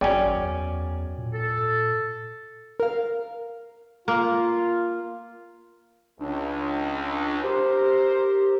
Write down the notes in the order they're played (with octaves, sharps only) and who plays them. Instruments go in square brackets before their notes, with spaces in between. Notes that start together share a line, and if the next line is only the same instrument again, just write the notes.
[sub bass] G#1 [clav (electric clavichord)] F#2 C#4 [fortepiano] D5 G5 G#5
[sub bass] E2
A#2
[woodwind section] A4
[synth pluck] A#4 F5
[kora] A#3 [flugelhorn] F4
[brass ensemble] C#2 [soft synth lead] D4
[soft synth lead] G4 [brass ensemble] A#4 C5